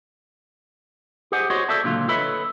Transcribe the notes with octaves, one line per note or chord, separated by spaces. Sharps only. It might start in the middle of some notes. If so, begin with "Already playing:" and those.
G4 G#4 C5 D#5 F#5 G#5
F#4 G#4 C5 C#5 D#5
A4 C5 D5 E5 A5
C#2 A#2 D3 F#3 F4
A4 B4 C#5 D#5 E5 B5